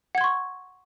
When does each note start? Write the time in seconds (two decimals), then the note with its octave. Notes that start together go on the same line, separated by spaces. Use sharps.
0.15 F#5
0.18 G#6
0.21 C6
0.24 C#6